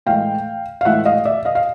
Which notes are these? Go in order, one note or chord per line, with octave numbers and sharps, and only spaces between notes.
A2 E3 G#3 F5 G5
F5
A2 E3 G#3 E5 F#5
D#5 F5
D5 E5
D#5 F5
F5